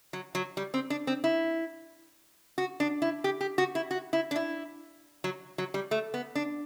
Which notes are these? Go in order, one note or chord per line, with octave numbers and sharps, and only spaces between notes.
F#3
F#3
G3
C4
D4
C4
E4
F#4
D4
E4
G4
G4
F#4
E4
F#4
E4
D4
E4
F#3
F#3
G3
A3
B3
D4